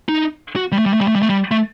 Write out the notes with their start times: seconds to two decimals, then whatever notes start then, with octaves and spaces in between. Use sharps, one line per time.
0.09 D#4
0.56 F#4
0.72 G3
0.79 A3
0.86 G3
0.94 A3
1.01 G3
1.08 A3
1.16 G3
1.22 A3
1.30 G3
1.51 A3